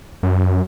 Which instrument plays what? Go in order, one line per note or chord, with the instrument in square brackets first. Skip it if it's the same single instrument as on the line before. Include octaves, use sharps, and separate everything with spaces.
[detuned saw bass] F#2